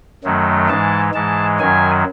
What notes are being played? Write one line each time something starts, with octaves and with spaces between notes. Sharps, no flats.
F#2 D#3 F#3 A3
G#2 E3 G#3 A5
G#2 E3 G#3 A5
F#2 D#3 F#3 G#5